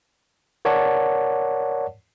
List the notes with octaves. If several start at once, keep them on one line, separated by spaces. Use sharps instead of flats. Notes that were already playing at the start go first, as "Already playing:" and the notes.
A#4 C#5 D5 F#5 A5